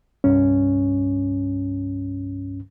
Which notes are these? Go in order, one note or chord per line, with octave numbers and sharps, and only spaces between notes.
C2 G2 C#4